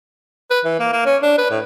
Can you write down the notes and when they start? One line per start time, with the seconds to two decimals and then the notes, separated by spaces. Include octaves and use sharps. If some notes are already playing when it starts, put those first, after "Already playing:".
0.50 B4
0.65 E3
0.79 A#3
0.93 A#3
1.06 C#4
1.22 D4
1.38 B4
1.51 A2